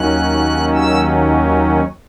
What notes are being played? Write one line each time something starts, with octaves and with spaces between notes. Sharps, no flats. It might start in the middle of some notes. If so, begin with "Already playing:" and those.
Already playing: D#2 D#3 F#3 C#4 F#6
E6